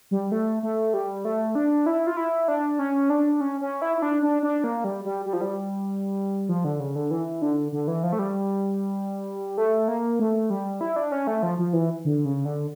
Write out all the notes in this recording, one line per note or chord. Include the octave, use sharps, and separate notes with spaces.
G3
A3
A3
G3
A3
D4
E4
F4
E4
D4
C#4
D4
C#4
C#4
E4
E4
D4
D4
D4
A#3
G3
G3
G3
F3
G3
F3
D3
C#3
D3
E3
D3
D3
E3
F3
A3
G3
A3
A#3
A3
G3
E4
D4
C#4
A3
F3
F3
E3
D3
C#3
D3